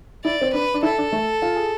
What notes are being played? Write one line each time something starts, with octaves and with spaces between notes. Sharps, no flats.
E4 D5
C4
D4 B4
D4
E4 A4
D4
A3
F4
G#4